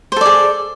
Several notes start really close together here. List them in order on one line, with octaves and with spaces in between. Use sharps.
C5 A4 D5 G#4